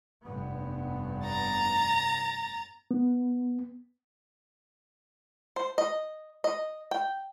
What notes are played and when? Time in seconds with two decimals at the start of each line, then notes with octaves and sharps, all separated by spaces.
0.23 F1 G2 B3
1.25 A#5 A6
2.91 B3
5.56 C5
5.78 D#5
6.44 D#5
6.91 G5